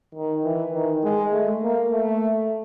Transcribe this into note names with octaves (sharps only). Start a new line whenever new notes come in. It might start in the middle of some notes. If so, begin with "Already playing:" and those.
D#3
E3
D#3
G#3
A3
A#3
A3